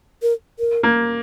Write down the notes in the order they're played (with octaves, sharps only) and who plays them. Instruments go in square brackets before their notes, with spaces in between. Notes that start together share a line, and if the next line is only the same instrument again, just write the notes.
[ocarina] A#4
A#4
[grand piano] A#3